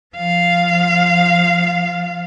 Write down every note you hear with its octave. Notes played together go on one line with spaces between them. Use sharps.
F3 F5